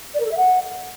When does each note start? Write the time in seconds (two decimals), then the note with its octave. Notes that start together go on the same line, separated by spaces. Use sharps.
0.14 D5
0.20 A#4
0.25 A4
0.31 E5
0.37 F#5